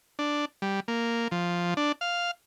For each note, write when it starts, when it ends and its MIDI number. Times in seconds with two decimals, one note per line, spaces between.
0.19 0.45 62
0.62 0.80 55
0.88 1.28 58
1.31 1.74 53
1.77 1.92 62
2.01 2.31 77